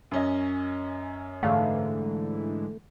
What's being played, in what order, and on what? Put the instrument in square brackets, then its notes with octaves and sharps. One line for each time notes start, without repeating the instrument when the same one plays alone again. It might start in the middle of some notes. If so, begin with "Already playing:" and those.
[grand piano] F#2 C#4 D#5
[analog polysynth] G#2 D3 E3 [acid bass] A3 [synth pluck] F5